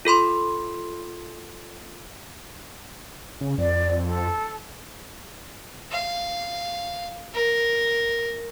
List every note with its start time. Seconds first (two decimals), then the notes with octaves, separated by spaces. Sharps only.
0.05 F4 A4 B5 C6
3.41 C#3
3.58 F2 D5
4.05 A4
5.91 F5
7.34 A#4